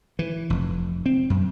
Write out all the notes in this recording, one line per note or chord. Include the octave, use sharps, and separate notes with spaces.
E3
F1
C4
F#2